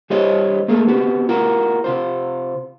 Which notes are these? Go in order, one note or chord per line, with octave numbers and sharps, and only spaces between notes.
G3 G4 C5 C#5 D#5
A3 A#3 G#4 A4
B3 C4 F#4 G4
F4 F#4 A#4
C3 F4 C5